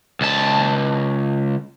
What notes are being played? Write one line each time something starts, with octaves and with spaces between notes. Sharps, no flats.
C#2 A5